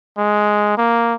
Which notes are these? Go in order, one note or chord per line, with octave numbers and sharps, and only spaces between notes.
G#3
A#3